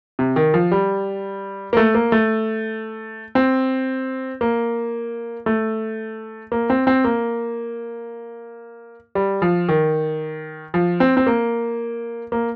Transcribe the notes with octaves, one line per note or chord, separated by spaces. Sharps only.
C3
D#3
F3
G3
A#3
A3
A#3
A3
C4
A#3
A3
A#3
C4
C4
A#3
G3
F3
D#3
F3
C4
C4
A#3
A#3